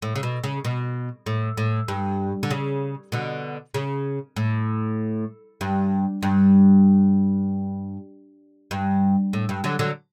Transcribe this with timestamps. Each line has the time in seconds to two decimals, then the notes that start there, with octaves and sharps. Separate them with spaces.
0.02 A2
0.16 C#3
0.23 B2
0.44 C#3
0.65 B2
1.26 A2
1.57 A2
1.88 G2
2.43 D3
2.51 C#3
3.12 B2 D3
3.74 C#3
4.36 A2
5.61 G2
6.23 G2
8.71 G2
9.33 A2
9.49 G2
9.64 D3 F#3
9.79 D3 F#3